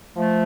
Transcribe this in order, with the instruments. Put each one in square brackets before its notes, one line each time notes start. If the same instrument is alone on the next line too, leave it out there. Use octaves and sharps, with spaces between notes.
[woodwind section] F3 A3